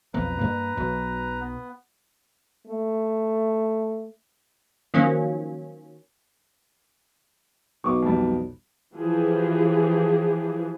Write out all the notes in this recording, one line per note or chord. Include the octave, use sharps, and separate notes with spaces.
B1 F2 F3 B4 A#5
G2 A#3
B1 F#3
B3
A3
D#3 F3 F#3 A#3 C#4
B1 C#6 D6
F2 G3
E3 F3 G4 G#4